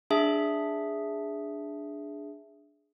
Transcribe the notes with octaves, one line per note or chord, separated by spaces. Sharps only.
D4 G#4 E5